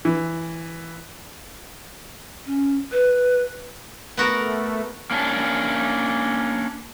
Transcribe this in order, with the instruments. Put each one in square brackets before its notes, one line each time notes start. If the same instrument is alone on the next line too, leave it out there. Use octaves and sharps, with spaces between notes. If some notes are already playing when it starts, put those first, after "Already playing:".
[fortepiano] E3
[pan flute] C#4
B4
[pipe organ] A3 [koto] B3 F#4 A#4
[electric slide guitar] A#3 C#4 D4